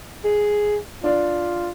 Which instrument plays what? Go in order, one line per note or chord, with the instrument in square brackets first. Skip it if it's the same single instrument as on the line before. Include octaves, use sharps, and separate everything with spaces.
[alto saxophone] G#4
[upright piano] D4 D5 [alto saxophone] F4